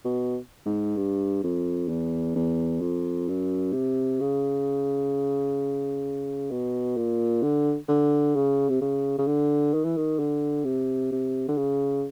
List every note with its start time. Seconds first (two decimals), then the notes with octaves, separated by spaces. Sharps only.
0.05 B2
0.66 G#2
0.97 G2
1.43 F2
1.88 E2
2.36 E2
2.81 F2
3.28 F#2
3.73 C3
4.20 C#3
6.51 B2
6.96 A#2
7.42 D3
7.88 D3
8.35 C#3
8.69 C3
8.81 C#3
9.18 C#3
9.27 D3
9.74 D#3
9.84 E3
9.97 D#3
10.19 D3
10.65 C3
11.12 C3
11.48 D3
11.57 C#3